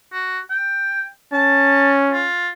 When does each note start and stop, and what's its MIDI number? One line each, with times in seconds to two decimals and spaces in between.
0.12 0.39 66
0.50 1.04 79
1.32 2.30 61
1.32 1.91 81
2.12 2.48 65